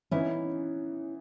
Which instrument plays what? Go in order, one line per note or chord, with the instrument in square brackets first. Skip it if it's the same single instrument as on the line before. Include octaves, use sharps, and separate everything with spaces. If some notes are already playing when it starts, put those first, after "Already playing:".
[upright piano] E3 B3 D#4 [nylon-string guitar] C#4 E4